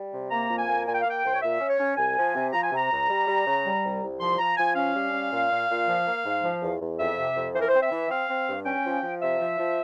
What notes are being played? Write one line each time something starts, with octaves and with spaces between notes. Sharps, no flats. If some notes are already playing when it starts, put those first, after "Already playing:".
Already playing: G3
C3
A#3 A#5
F2
G#5
A#3
A#2 G#5
G5
F5
A#3 G5
C2 C5
C#5
A#2 E5
C#4
C#5
C#4
C2 G#5
F3
C3
F3 A#5
G#5
C3 A#5
C#2
G3
G3
C#3
G3
C2
C2
F3 C6
F3 A#5
F3 G#5
C#4 F5
G3
C#4
A#2
A#2
A#2
F3
A#3
G#2
F3
E2
E2
F2 E5
C3
F2
E3 C5
A#4
C4 C5
E5
E3
C4 F5
C4
G2
C#4 G5
F3
F3
C3 E5
F3
F3